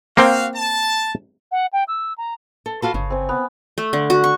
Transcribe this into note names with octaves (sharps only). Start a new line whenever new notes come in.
A#3 C4 F#4 F5 G5
A5
F#5
G5
E6
A#5
A4
F4 F#4 A4 B4
G1 C#3
C4 G#5
B3
A3
D3
F#4
C#6